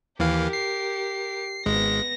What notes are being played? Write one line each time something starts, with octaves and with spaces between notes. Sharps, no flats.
D#2 E3 G4 A#4 F5
C7
G#1 G#3 B3 A#6